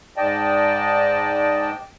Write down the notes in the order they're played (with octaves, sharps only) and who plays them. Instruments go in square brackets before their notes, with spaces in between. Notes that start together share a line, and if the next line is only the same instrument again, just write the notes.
[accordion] G#2 D5 D#5 G5 A5